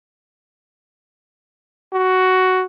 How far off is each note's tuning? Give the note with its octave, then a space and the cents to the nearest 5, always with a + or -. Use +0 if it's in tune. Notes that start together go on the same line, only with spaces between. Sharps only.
F#4 +10